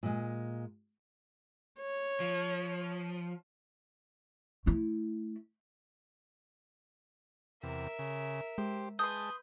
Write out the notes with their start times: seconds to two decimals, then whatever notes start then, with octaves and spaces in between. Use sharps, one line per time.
0.03 A#2 G#3
1.80 C#5
2.20 F3
4.66 A3 E4
7.63 E2 C3 A#4 E5
7.99 C#3
8.58 G#3 G4 C5
8.99 G#3 B4 A5 C6 D#6 G6